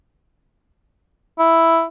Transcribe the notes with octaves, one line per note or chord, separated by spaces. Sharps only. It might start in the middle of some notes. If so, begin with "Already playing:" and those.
E4